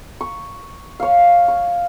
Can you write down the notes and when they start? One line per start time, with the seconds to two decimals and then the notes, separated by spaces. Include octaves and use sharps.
0.21 C#6
1.00 C#5 F5
1.48 C#6